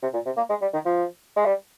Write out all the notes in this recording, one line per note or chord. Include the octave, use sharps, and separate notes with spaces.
C3
A#2
C3
A#3
G#3
G3
D#3
F3
G#3
G3